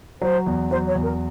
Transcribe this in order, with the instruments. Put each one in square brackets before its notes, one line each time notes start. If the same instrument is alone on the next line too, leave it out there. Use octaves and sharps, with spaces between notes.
[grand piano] F#3 [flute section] C5
[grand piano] E2
[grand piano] F#3 [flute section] C5
[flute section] C#5
[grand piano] E2
[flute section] A#4